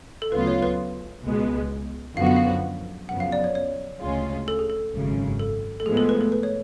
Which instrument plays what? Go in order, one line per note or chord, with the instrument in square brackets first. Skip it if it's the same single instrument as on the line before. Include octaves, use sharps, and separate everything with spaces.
[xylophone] A4
[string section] D2 C#3 F#3 B3 F4 [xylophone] B4
[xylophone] C#5
B4
[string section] C#2 B2 G#3 B3
[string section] F#2 D3 F3 B3 F#4 [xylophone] F5
[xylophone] F#5
F5
[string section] F#2 C#3 F3 B3 [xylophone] F#5
[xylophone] F5
D5
C#5
C#5
[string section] D2 C#3 G#3 C#4 F4
[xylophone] A4
G#4
A4
[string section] G#1 F#2 C#3
[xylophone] A4
A4
[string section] A2 F3 G#3 B3 [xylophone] G#4
[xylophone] A4
B4
A4
B4
C#5